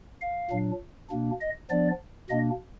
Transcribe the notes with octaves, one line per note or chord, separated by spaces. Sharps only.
F5
A#2 F#3 D4
B2 A#3 D4
D#5
F3 B3 D4 D5
B2 A#3 D4 D#5